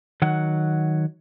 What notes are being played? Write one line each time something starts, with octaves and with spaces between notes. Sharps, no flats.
D#3 F#3 F#5